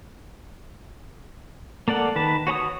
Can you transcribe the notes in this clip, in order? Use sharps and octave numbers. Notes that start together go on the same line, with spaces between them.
A#3 A4 D5 F#5
D#3 B4 A5
F#4 C#5 G#5 D#6